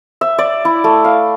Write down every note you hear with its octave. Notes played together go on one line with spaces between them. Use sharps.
E5
D5
E4
A3
F5